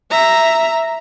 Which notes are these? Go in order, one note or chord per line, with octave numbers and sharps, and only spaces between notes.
E5 A#5